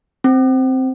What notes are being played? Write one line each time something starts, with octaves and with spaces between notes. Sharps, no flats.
C4